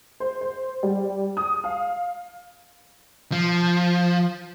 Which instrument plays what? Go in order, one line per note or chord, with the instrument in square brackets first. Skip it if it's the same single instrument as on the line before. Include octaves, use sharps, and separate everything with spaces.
[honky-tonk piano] C5
C5
G3
D#6
F5
[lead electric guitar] F3